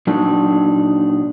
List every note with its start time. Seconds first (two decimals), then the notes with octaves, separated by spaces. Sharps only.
0.07 A#2 F#3 D4 D#4